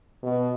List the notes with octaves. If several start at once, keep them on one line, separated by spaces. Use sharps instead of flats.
B2